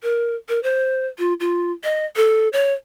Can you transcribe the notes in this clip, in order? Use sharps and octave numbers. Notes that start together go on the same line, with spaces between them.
A#4
A#4
C5
F4
F4
D#5
A4
C#5